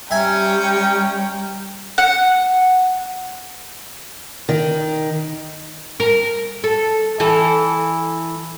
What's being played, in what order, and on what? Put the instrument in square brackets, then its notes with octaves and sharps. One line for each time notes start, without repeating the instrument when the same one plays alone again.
[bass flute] G3 [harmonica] C#4 A#5 [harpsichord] E5 G#5 [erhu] G5
[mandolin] F#5
[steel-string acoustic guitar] D#3
[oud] A#4
A4
E3 A4